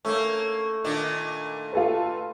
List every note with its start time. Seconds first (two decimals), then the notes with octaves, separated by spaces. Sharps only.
0.05 A3 A#3 C#4
0.84 A#2 D#3 D4
1.73 F4 A4 B4